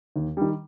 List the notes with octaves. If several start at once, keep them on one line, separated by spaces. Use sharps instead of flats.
D#2
D#3 G3